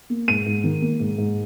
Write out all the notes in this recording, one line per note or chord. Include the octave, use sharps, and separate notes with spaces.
A#3
G#2 D#7
G#2
D#3
A#3
G#2
G#2